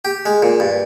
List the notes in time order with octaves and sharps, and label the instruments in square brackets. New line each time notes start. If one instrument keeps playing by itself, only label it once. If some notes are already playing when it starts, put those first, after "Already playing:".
[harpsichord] G4
G#3
A#2
G2